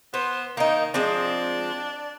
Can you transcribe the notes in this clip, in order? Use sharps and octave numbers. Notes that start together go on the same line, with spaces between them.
B3 C5
D#3 A#3 D#4
F3 G#3 C4 D4